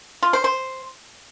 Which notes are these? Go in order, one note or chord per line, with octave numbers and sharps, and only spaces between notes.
F4
C5
C5